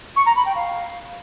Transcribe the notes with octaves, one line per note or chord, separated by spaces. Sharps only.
C#6
A#5
B5
G5
F5